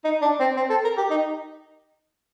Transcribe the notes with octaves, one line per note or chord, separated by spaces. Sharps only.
D#4
D4
C4
C4
A4
A#4
G4
D#4